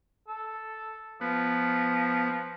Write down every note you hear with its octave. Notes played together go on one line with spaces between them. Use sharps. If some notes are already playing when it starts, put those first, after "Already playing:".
A4
F3 B3